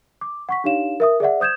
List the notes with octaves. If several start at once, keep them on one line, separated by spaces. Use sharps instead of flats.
D6
F#5 C#6 B6
D4 D#4 G4 C#5 F5 E7
A#4 E5 D#6
G#4 D5 E5 F#5
C5 D#6 G6 G#6 E7